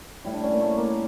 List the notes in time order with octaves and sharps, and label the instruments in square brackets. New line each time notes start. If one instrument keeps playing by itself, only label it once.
[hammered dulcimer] A2 G3 E4
D4
C#4
A#3
A3
A#3